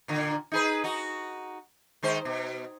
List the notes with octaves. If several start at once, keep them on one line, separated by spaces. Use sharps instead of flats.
A#2 D3
D#4 G#4 B4
D#4 F#4
D#3 G#3 C5
B2